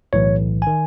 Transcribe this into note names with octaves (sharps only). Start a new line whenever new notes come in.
B1 A2 E3 C#5
D#3 G#5